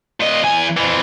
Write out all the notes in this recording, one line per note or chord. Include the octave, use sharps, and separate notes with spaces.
A#2 D#5
E2 G#5
F2 E3